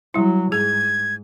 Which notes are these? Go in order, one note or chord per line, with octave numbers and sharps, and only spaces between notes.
F#3 G3 E4
G#2 G#4 G#6